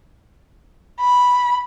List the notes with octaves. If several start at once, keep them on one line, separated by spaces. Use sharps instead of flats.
B5